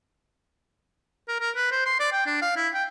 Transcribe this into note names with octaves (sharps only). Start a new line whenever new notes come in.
A#4
A#4
B4
C5
C6
D5
G5
D4
F5
E4
G5